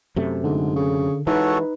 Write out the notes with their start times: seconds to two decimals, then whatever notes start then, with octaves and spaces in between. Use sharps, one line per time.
0.16 F#2 C3 A3
0.44 G#2 D3
0.76 C#3
1.27 G#2 E3 D#4 F#4 A4 B4 C#5